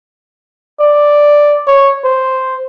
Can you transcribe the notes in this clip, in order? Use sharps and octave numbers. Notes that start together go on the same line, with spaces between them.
D5
C#5
C5